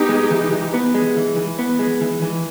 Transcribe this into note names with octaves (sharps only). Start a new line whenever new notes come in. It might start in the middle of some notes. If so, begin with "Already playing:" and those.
Already playing: B3 D#4 G4
G#3
E3
E3
B3
G#3
E3
E3
B3
G#3
E3
E3